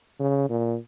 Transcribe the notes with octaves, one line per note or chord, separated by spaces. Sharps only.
C#3
A#2